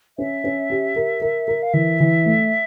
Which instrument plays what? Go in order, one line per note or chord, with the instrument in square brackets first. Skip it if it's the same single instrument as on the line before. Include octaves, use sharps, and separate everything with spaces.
[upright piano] C#4 [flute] E5
[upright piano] C#4
G4
A#4
A#4
A#4
[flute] F5
[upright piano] E3 [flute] E5
[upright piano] E3
A3